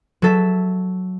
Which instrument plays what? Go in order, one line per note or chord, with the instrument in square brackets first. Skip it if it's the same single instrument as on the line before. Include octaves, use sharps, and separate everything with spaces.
[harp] F#3 A4 E5